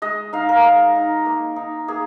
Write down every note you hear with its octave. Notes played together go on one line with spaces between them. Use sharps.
G#3 D#5
D#4 F5
A#4
G#3
D#4
A#3
D#4
A#3 G#4